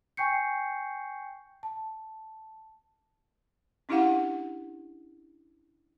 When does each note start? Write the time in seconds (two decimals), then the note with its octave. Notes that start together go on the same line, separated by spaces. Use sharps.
0.17 G5 G#5 C#6 G6 C7 C#7
1.63 A5
3.89 C#4 D4 E4 G4 F5 F#5